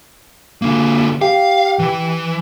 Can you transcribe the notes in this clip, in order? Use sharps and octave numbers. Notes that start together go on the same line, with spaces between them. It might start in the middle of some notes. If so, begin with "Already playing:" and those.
D3 A#3
G4 F5
E3